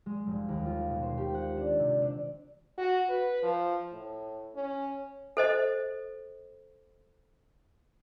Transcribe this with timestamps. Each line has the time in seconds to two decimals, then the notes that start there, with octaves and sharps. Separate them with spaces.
0.06 G#3
0.27 F1
0.49 D#2
0.66 F4
0.90 B2
1.02 C5
1.17 G4
1.34 F#5
1.57 D4
1.79 C3
2.01 D4
2.78 F#4
3.09 B4
3.43 F3
3.92 A2
4.55 C#4
5.37 A4 C5 D#5